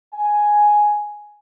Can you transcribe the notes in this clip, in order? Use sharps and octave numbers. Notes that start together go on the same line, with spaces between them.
G#5